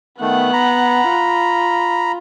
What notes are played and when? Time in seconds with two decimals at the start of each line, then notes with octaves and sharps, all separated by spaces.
0.21 D#3 A3 B3 F#5
0.53 A#5 B5
1.10 F4